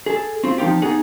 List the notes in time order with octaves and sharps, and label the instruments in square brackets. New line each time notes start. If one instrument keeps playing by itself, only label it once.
[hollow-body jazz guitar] G#4 A4
C4 F4
F3 C4 D#4 F4 G4
B3 D#4 G#4 F#5